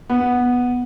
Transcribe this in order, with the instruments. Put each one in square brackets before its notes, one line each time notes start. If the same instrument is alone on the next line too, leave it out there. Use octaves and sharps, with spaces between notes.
[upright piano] B3